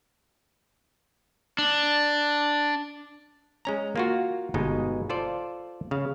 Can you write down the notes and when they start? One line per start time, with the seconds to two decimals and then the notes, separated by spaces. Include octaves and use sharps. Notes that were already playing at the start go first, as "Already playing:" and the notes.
1.58 D4
3.65 G#3 C#4 A#5
3.96 A#3 F4 F#4
4.54 G1 B2 G#3 D#4
5.10 F4 A4 C5 D5
5.91 C#3 F5